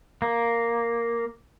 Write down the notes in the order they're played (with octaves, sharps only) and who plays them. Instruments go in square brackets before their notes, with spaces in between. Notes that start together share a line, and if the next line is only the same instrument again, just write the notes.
[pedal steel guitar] A#3